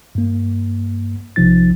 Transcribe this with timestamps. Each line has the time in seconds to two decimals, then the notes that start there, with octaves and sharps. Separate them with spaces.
0.15 G2 A#3
1.36 A#1 C3 F3 D#4 A6